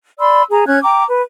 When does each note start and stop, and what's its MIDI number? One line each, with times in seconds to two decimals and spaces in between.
0.19 0.43 74
0.19 0.43 83
0.19 0.43 84
0.19 0.43 88
0.50 0.64 68
0.50 0.64 82
0.66 0.78 61
0.66 0.78 73
0.66 0.78 90
0.66 0.78 92
0.83 1.04 79
0.83 1.04 82
0.83 1.04 86
1.07 1.22 71